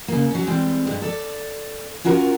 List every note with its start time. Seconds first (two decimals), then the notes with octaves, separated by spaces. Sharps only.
0.08 C#3 A#3
0.31 F#3 C#4
0.47 E3 G3 G#3 C4
0.87 G2 G#3
1.02 A4 D5
2.04 C#4 F4 F#4 A#4